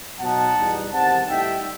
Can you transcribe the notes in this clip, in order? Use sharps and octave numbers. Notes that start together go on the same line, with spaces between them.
B2 F#3 B3 D#4 F#5 A5
E2 B2 G3 D#4
E2 D#3 G3 C4 F#5 A5
A2 G3 D#4 E5 G5